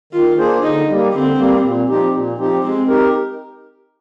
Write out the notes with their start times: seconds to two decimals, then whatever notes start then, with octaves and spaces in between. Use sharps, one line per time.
0.13 D#3 F4
0.38 A#3 D4 G#4 C5
0.63 D3 D#4
0.89 G3 A#3
1.13 D3 C4
1.38 G3 A#3
1.63 A#2
1.89 F3 C4 D#4 G4
2.13 A#2
2.38 F3 C4 D#4 G4
2.62 G#3 C4
2.88 D#4 G4 A#4